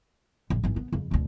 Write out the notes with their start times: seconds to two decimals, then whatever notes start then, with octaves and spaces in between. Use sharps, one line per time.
0.50 A#1
0.64 G#1 E3
0.76 B3
0.93 F2 C#3
1.11 D2 B2